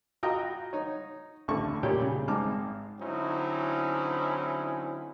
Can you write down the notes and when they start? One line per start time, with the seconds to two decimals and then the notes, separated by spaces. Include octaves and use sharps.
0.23 F4 F#4 D#5 G5 A#5 D#6
0.73 D#4 C#5
1.48 A1 D2 D3 A5 C#6
1.83 G2 A#2 G3 G4 C#5 G5
2.02 C#3
2.28 G#1 G#2 D#4 A5 D6 F6
3.00 D3 F#3 C4 C#4 D#4 E4